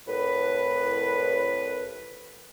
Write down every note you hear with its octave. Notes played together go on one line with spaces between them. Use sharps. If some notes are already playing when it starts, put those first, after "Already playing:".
C2 A2 B4